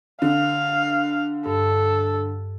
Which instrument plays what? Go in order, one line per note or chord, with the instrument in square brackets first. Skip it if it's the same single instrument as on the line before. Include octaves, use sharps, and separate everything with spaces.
[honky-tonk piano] D3 [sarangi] F5
[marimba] G2 [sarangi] A4